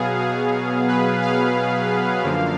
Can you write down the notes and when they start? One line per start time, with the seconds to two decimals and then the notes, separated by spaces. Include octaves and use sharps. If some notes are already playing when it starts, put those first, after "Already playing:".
Already playing: B2 F#3 B3 G#4 F5
0.21 G#4
0.88 B4
1.22 F5
2.23 F#2 D3 F3 A#3